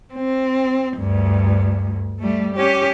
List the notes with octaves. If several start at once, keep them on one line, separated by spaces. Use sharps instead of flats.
C4
D2 G2
G3 A3
C#4 G4